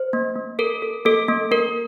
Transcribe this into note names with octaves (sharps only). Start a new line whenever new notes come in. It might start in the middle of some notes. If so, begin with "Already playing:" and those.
Already playing: C5
A#3
A#3
A4 A#4
A4
A#3 A4
A#3
A#3 A#4